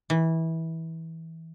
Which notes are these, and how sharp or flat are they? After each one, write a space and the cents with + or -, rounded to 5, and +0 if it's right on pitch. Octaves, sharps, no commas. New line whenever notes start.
E3 -20